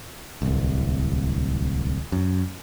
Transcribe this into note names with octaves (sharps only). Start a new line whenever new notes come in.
D1 C2
F#2